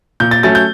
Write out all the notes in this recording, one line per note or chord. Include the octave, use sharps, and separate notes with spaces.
A#2 G6
A6
F#3 A3 C#4 A6
G6